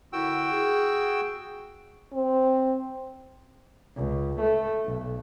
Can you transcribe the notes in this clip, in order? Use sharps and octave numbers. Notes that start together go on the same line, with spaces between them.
F#2 D3 E4 F#4 G5 E6
G#4
C4
C#2
A3
B1